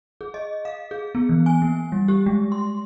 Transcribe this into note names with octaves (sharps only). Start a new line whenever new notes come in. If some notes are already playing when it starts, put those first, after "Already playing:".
G#4
D#5
F5
G#4
B3
E3
G#5
A#3
G3
G4
G#3
C6